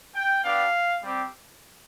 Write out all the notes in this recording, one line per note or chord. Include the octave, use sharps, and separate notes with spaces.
G5
B3 D4 G4 F5
G3 C4 G4